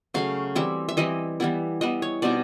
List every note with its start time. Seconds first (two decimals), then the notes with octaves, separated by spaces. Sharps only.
0.14 C#3 F#3 A3 C#4 F5
0.55 E3 G3 C4 E4 E5
0.89 E5
0.97 E3 G3 C4 E4 D#5
1.40 E3 G3 B3 E4
1.81 E3 G3 B3 E4 D#5
2.02 C#5
2.22 B2 G3 C4 D#4 D5